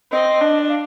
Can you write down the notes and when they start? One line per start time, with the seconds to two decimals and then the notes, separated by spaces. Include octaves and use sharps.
0.11 C4 D#5
0.41 D4
0.69 F5